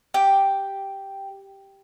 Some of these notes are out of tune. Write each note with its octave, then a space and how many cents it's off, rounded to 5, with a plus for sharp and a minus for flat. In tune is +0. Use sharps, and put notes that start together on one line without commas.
G4 +0 G5 +0